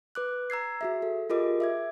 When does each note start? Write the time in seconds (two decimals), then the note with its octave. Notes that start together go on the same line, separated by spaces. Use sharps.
0.15 B4 D6 F#6
0.50 A#5 E6 G#6 C7
0.81 F#4 G#4 E5
1.02 A4
1.30 F4 G4 G#4 A#4 D#5 D6
1.60 E5 D6 G#6